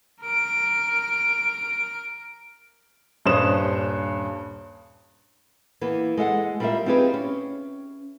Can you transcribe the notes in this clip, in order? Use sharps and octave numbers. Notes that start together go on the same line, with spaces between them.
A#4 D7
D#1 G2 C#4 C5 D#6 E7
E3 A#3 B3
G#3 A4 E5 F#5
G3 A#3 B3 F4 A#4 E5
C4 D#4 F4 G4 G#4 B4
C#4